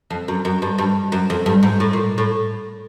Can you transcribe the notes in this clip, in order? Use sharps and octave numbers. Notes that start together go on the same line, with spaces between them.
F2
F#2
F#2
G2
G2
F#2
F2
G2
G#2
A2
A#2
A2